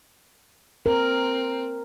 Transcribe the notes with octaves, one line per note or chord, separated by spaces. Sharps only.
C4 A#4